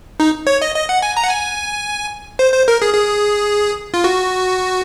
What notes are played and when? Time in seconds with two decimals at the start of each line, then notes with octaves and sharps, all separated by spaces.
0.20 D#4
0.47 C#5
0.62 D#5
0.75 D#5
0.89 F#5
1.02 G#5
1.17 A#5
1.23 F#5
1.29 G#5
2.39 C5
2.53 C5
2.68 A#4
2.82 G#4
2.94 G#4
3.94 F4
4.04 F#4